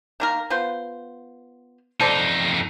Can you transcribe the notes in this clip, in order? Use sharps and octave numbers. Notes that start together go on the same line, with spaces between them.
D#3 A#3 A#4
B3 F4 C5
F2 D#4 A4 C5 D5